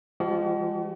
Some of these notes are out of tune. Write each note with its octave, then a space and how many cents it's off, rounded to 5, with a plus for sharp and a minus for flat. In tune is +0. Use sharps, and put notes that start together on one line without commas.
F3 -10 G#3 -30 F#4 +45